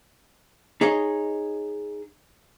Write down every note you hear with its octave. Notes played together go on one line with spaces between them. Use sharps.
D#4 G#4 C#5 D#5